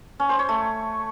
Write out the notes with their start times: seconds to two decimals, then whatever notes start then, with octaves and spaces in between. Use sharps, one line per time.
0.20 C#4
0.29 C5
0.39 C#5
0.49 A3